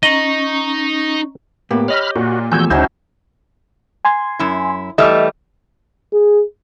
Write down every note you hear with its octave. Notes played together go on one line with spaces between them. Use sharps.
C#4 D#4 D#5 A#5 C#6
A2 A#3 B3 G4
C#5 D#5 B5 F6
A#2 F#4
E2 F3 A3 F#4 G#5 E6 G6 G#6
D2 C#3 E3 F#3 C#4 D#4 C5
G#5 C6 G#6
F#2 E4
E3 G3 A3 D#5 E5 F6
G#4